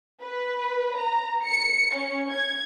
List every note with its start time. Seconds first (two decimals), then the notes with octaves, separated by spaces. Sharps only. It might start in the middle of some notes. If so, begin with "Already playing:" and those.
0.22 B4
0.97 A#5
1.44 C#7
1.94 C#4
2.32 G#6